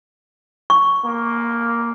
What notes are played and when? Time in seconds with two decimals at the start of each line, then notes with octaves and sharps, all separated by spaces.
0.70 C#6
1.05 A#3